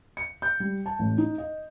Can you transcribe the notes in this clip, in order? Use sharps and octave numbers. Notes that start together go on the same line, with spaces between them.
C#7
G6
G3
A5
A1
D#4
D#5